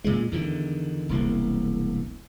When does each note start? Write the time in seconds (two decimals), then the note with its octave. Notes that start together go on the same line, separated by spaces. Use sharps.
0.04 A#2 G#3
0.32 E2 D3 D#3
1.09 E1 C2 A#3